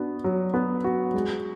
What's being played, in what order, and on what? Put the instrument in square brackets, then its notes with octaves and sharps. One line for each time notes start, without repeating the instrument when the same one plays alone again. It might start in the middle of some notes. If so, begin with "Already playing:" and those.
Already playing: [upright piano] B3 D4 F#4
F#3
B3
F#4
G#3